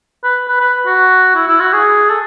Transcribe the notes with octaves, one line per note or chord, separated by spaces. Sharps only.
B4
B4
B4
F#4
E4
E4
F#4
G#4
A4